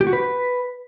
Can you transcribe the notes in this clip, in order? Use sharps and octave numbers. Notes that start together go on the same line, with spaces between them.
G4
F#4
B4